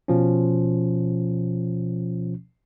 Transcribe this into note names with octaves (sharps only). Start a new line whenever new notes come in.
B2 F3 C#4